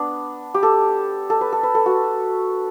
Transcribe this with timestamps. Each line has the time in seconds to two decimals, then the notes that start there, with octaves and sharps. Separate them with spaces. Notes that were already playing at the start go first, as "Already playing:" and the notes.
Already playing: B3 D4
0.54 G4
0.63 A4
1.30 A4
1.41 B4
1.53 A4
1.63 B4
1.75 A4
1.86 F#4